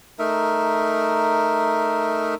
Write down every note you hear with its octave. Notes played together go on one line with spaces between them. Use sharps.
A3 D#4 A#4 E5